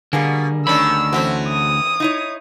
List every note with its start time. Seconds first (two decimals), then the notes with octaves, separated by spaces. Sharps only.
0.13 B2 D3 G3 A#3 G#4
0.67 D2 D#3 C#4 D4 B5 E6
1.13 E3 A3 C4 C#4 F#4
1.48 D#6
2.00 D#4 E4 C#5